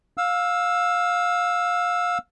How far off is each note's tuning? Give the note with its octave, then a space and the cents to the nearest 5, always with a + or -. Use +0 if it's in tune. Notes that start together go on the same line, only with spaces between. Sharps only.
F5 +20 E6 +0